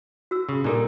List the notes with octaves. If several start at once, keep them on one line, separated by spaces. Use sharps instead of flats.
F#4 E6
C#3
A#2 G3 D4 D#4 A4 A#4